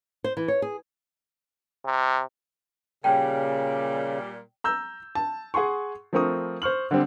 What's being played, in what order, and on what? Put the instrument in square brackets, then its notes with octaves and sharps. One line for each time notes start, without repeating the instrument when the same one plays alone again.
[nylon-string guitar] C5
E3
C#5
G#4
[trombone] C3
[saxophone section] A#2 G3 [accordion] C#3 [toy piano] D5 G5 A5
[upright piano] A#5 E6 G6
A5
G#4 F#5 G#5 C6 C#6
F3 A3 C4 A#4 C#6 D#6
C5 C#6 F6 F#7
D3 G3 C4